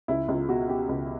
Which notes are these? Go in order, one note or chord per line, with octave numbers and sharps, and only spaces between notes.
C#2 E4
C#2 F4
B2 F#4
B2 G4
C#2